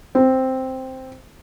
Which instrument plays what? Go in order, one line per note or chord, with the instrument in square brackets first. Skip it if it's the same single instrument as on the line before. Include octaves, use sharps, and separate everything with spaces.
[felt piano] C4